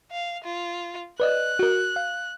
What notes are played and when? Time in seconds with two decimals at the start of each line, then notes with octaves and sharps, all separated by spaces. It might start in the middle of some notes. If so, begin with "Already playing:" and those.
0.12 F5
0.44 F4
1.20 B4 D5 D#5 F#6
1.59 F#4 A#4
1.96 F5